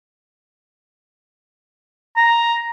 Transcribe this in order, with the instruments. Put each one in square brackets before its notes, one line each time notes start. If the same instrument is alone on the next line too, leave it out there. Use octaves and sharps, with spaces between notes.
[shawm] A#5